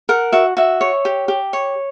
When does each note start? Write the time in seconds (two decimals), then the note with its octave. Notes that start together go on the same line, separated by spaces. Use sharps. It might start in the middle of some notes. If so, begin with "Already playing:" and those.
0.09 A#4 F#5
0.32 F#4 E5
0.57 F#4 E5
0.81 C#5
1.05 G4
1.28 G4
1.53 C#5